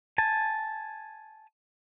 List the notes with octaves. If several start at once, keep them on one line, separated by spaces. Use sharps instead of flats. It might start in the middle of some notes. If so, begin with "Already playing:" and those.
G#5 A5